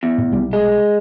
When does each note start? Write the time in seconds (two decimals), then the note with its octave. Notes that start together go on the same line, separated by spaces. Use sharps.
0.03 E2
0.18 A2
0.32 B1 C3 G3
0.53 G#3